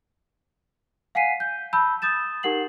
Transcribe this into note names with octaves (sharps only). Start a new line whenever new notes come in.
F5 F#5 G#5 B6 C7 D#7
G6
A5 B5 E6 G6
D#6 G6 A6 E7
D#4 G4 A#4 F#5 C7 F#7